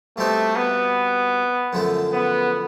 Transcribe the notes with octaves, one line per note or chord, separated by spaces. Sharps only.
B2 G3 A3 C4 D#4 G4
B3
F#2 D3 F3 A3
B3